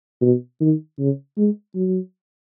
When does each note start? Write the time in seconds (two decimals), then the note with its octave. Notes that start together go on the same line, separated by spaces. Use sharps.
0.22 B2
0.61 D#3
0.99 C#3
1.37 G#3
1.75 F#3